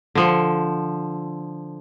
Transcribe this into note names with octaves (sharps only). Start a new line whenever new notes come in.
D3 F3